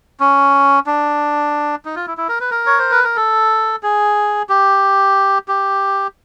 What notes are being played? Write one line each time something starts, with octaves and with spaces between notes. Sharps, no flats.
C#4
D4
D#4
F4
E4
E4
A#4
B4
A#4
C#5
C5
B4
A#4
A4
G#4
G4
G4